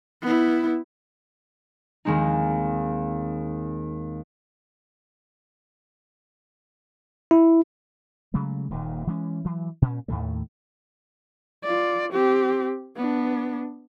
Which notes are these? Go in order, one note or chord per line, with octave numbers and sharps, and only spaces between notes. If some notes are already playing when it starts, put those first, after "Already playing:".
B3 E4
D#2 D#3 G#3 C4 D#4
E4
C#3 F#3 G#3 A3
D#1 D#2 A#2 D#3
E3 G#3 C#4
E3 F#3
A#2 C#4
D#2 A2 D#3 A3
F4 D5
C4 G4
B3 D4